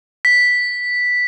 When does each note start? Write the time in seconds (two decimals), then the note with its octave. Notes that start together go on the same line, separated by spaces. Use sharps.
0.25 B6